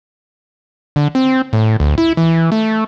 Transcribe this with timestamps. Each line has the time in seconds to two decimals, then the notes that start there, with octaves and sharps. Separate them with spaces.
0.96 D3
1.15 C4
1.53 A2
1.80 D2
1.98 E4
2.17 E3
2.52 A3